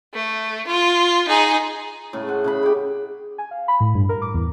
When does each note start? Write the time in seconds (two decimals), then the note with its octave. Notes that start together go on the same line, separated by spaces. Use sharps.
0.14 A3
0.67 F4
1.28 D#4 G#4
2.13 A2 C#3
2.27 C5 F#5
2.44 C#3 G#4 B5
2.63 E4 G4
3.38 G#5
3.51 F5
3.68 B5
3.80 A2
3.95 G2
4.09 A#4
4.22 D6
4.34 E2